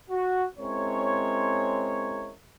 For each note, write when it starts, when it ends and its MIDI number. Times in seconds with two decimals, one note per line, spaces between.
0.10 0.44 66
0.59 2.32 56
0.59 2.32 60
0.59 2.32 61
0.59 2.32 64
0.59 2.32 70
0.59 2.32 73